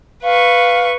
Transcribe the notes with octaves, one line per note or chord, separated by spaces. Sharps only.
B4 F5 C#6